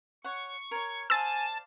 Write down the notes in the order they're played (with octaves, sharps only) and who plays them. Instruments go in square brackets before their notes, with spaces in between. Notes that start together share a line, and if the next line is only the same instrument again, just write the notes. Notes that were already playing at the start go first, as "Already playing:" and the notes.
[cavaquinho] C#5 F#5 [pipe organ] C#6
[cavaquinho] A#4 C#5 [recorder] G#6
[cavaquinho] C5 D5 F5 [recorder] G#5 [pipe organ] A5 [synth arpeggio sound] E6 A6